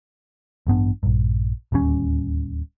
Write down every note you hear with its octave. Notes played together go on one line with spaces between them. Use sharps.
A1 G2 B3 D4
A#1 G2
D1 D#2 G3 C#4